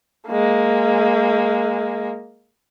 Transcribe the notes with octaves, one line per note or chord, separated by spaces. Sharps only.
G#3 A#3